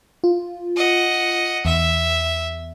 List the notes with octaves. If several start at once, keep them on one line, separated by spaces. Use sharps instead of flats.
F4
D#5 F#5
E2 E5